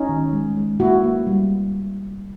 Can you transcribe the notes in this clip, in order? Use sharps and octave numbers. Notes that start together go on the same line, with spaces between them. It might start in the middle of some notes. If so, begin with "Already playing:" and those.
Already playing: C#4 D#4
D#3
G#3
G#3
A#3 E4 F#4
A#3
G3